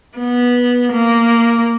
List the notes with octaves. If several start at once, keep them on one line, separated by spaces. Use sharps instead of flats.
B3
A#3